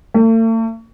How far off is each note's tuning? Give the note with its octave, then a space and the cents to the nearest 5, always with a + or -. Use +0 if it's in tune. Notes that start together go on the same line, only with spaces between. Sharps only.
A3 +45